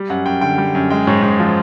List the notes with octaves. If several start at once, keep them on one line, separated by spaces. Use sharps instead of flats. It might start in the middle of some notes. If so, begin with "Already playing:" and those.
Already playing: G3
F#2 F#5
F#2 G5
D3 G5
G3
F#2
G#3 G5
G#2 C#5
G#2
F3